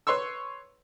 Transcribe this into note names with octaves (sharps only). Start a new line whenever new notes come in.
B4 C#5 C6 C#6 E6